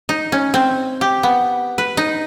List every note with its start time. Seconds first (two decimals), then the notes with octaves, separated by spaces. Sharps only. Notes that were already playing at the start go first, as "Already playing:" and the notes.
0.09 D#4
0.32 C#4
0.54 C4
1.01 G4
1.23 B3
1.78 B4
1.97 D#4